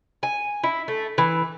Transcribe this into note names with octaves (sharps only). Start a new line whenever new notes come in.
G#5
E4
A3
E3